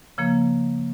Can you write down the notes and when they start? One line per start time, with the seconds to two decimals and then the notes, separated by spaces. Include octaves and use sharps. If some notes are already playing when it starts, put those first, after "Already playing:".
0.18 C#3 F3 A#3